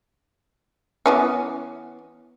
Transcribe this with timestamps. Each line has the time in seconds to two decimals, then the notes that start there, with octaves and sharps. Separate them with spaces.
1.06 E3 B3 C#4